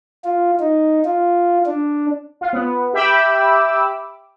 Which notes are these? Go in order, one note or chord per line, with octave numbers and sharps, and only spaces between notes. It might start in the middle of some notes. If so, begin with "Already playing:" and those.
F4
D#4
F4
D4
F4
B3
G4 E5 G5 B5 D6 E6